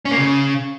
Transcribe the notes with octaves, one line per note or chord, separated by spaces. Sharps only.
C#4
A#3
C#3